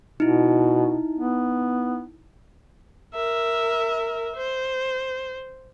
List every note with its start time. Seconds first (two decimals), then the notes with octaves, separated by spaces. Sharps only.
0.20 B2 D#4 E4
1.17 B3
3.15 A#4 E5
4.36 C5